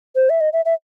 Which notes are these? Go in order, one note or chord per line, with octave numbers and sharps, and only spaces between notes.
C5
E5
D#5
E5
E5